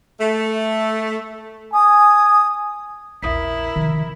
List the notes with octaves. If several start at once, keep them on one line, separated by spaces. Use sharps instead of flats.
A3
G#5 D#6
A#1 E2 E4 A#4 E5 D#6 B6
C3 D#3 F3